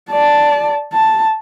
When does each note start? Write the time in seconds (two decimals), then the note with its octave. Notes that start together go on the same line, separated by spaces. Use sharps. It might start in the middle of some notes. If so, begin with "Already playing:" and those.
0.11 D5 A5
0.93 A5